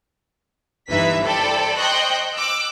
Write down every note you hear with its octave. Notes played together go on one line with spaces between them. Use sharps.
G1 E3 D#4 B4 E5 B6
A4 C5 D5 G5 B5
C5 D#5 G5 C#6 F#6 G6
D6 E6 F#6